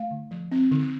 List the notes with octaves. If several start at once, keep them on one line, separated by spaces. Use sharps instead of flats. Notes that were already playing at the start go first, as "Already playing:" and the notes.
Already playing: A3 F5
D3
F3
C4
D3